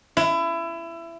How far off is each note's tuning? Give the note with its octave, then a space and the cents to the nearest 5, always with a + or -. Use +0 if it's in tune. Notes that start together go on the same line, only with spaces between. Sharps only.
E4 +25